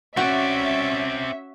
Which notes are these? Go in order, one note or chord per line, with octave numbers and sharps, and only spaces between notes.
C4 C#4 F#4 D5 E5